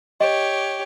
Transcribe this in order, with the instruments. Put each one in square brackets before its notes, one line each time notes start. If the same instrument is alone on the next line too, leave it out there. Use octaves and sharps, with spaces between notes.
[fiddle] G4 C#5 [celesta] D#5